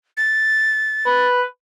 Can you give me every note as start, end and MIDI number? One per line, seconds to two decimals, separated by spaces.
0.17 1.28 93
1.06 1.43 71